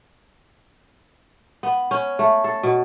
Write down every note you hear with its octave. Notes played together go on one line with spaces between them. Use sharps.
B3
C#4
A3
A4
B2